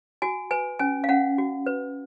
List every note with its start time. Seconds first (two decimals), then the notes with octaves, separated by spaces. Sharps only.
0.22 F#4 G#5
0.51 B4 G#5
0.79 C#4 G#5
1.04 F5
1.09 C#4 F#5
1.38 F#4
1.66 B4